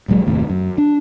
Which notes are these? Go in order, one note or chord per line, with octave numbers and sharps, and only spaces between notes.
D1 A#1 F#3 G#3
F#1 D#2 A2 C3
F#2
D4